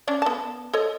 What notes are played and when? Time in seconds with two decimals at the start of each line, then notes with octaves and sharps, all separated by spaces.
0.07 C#4 D4 D5
0.22 B3 A5
0.73 A4 C#5 D#5